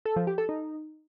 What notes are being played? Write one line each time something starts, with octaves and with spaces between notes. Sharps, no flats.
A4
F3
G4
A4
D#4